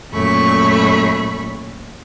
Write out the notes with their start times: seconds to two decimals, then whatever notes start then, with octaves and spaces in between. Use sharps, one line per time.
0.12 F#2 A#2 A3 B5 C#6